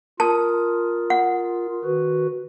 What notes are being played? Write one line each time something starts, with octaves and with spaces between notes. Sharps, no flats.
F4 A#4 A5 D#6
F#5
D#3 F#4 B4